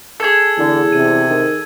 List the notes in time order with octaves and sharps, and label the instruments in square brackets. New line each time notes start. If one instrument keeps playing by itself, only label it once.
[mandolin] G#4 A4 [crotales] E6 G#6
[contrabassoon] E2 [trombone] D3
[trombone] C3 [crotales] D#7
[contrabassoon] D#3